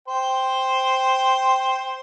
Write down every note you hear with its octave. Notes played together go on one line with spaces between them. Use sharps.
C5 G5